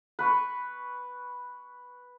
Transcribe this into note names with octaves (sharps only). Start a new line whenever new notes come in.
B4 C#6